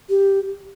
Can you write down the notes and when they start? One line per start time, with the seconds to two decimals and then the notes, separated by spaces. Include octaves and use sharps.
0.10 G4